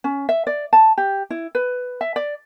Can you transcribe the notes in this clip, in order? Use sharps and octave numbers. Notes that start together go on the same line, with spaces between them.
C#4
E5
D5
A5
G4
E4
B4
E5
D5